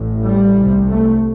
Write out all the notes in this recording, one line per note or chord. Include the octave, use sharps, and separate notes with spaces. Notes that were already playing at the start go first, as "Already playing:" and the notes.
Already playing: A1 A2
G3
C2 C3
A3